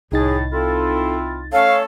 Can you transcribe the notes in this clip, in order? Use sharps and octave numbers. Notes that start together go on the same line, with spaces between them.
C2 A2 D#4 G#4 A6
C4 E4 F4 A4
A3 C#4 A4 C#5 F5